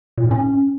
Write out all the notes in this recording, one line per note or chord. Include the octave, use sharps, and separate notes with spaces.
A#2
A2
C#4